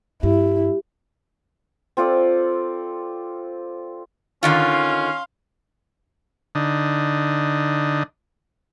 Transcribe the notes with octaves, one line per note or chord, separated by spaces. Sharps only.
G2 E4 G4
C4 F4 A4 D5
D3 D#3 C#4 F4 F5 C6
D3 D#4